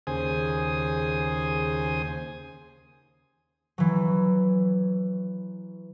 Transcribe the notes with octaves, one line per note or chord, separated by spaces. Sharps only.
D#2 C#3 G#4 C5 G#5 D#6
E3 F#3